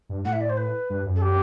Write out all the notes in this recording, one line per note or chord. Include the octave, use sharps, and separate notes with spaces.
G2
A2 F#5
E5
D5
C5
B4
G2
F#2
A4
G4